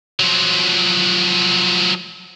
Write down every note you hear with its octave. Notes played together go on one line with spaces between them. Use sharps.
F3 F#3